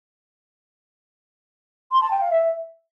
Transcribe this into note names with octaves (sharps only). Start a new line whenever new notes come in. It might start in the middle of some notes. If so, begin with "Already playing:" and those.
C6
A5
G5
F5
E5